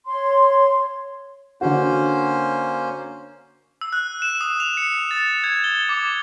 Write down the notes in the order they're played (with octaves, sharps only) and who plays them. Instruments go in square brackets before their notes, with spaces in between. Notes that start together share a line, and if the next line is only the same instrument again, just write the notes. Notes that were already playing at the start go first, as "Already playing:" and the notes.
[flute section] C#5 C6
[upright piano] D3 F#4 [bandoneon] A#3 C#4 C5
[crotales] E6
F#6
E7
D#6
F7
C#7
A6
G#6
G7
D6